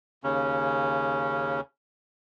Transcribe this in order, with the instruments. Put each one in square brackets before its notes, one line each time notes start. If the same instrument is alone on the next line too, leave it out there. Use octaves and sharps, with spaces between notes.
[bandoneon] D#2 C#3 C#4